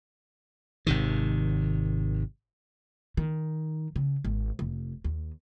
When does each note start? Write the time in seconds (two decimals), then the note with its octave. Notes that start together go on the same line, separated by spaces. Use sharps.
0.87 G#1 C3 D#3
3.17 D#3
3.96 C#3
4.25 G#1
4.59 F1
5.04 D#2